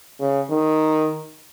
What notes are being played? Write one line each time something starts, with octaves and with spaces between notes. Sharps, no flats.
C#3
D#3